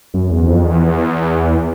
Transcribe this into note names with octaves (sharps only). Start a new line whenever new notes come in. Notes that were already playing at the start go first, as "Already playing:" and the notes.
F#2
E2
F2
E2